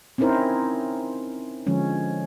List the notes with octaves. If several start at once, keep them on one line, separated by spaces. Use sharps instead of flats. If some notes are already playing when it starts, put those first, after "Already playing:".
C4 C#4 D#4 E4 A#4 C5
D3 F3 G#3 C#4